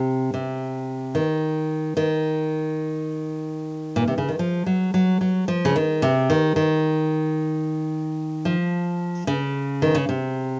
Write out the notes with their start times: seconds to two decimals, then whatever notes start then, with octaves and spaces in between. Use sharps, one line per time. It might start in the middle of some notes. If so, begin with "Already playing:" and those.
Already playing: C3
0.34 C3
1.15 D#3
1.97 D#3
3.96 A#2
4.08 C3
4.18 C#3
4.29 D#3
4.39 F3
4.66 F#3
4.94 F#3
5.21 F#3
5.48 F3
5.65 C#3
5.76 D#3
6.02 C3
6.30 D#3
6.56 D#3
8.45 F3
9.27 C#3
9.82 D#3
9.95 C#3
10.09 C3